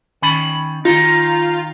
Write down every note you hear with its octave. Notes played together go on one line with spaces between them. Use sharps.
D#3 C#4 B5
D#3 D#4 F4 A#5